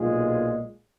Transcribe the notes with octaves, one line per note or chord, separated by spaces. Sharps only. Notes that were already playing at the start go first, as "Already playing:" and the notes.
Already playing: B1 A#2 G#3 F4 G#4